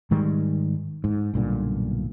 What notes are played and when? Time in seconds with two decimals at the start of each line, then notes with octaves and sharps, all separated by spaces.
0.11 G#2 D#3 G3 G#3
1.04 G#2
1.34 B1 G2 A#2 D3